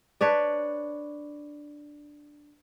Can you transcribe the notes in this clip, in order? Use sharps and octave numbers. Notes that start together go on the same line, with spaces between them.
D4 B4 C#5 D5